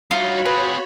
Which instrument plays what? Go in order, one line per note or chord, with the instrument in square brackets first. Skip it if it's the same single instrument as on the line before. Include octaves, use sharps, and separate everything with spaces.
[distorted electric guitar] G2 D#4 [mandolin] F4 [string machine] F#4 C#5 B5
[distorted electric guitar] C4 G#4 [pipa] B4